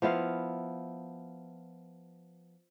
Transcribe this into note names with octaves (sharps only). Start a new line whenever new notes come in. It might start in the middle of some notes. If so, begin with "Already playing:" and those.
F3 B3 E4 F5